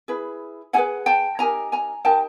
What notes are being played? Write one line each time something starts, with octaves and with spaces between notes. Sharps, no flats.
E4 G#4 B4
E4 G#4 B4 F#5 G#5
G5 A5
D#4 G4 A#4 G#5 A#5
G#5 A#5
D#4 G4 A#4 G5 A5